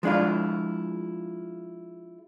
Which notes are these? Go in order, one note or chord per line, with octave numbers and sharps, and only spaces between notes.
F3 G#3 D4 E4 F4